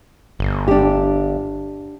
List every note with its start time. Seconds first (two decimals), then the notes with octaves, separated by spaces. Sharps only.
0.39 G1
0.68 D4 G4